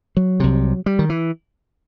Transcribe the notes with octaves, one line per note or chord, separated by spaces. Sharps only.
F#3
C2 C3
G3
D#3
E3